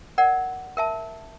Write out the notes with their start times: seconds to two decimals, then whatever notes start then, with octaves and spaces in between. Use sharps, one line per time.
0.18 A#4 D5 F#5
0.77 A#4 E5 A5